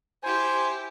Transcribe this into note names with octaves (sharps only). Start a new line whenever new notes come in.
E4 G4 C5 G#5